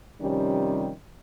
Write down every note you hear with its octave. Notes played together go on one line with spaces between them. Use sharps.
C3 D#3 F3 G3 C#4